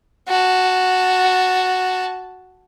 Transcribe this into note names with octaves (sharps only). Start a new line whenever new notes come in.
F#4 A5